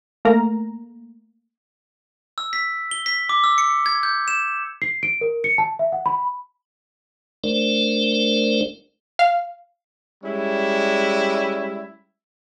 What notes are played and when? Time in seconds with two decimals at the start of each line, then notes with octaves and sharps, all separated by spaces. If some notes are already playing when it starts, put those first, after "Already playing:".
0.25 A3 A#3 A#4 A#5
2.38 E6
2.53 B6
2.91 G7
3.06 B6
3.29 D6
3.44 E6
3.58 C#7
3.86 G#6
4.03 G6
4.28 E7
4.82 C7
5.03 D7
5.21 A#4
5.44 C#7
5.58 A5
5.79 E5
5.92 F#5
6.06 B5
7.44 A3 D4 A#4 C5 D5
9.19 F5
10.24 G3 G#3 C#4 E4